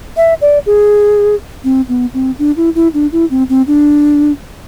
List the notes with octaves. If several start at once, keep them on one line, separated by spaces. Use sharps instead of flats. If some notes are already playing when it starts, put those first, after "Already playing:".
E5
D5
G#4
C4
B3
C4
D4
E4
E4
D4
E4
C4
C4
D4